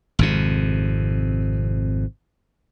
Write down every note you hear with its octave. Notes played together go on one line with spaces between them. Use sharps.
G#1 F2 C3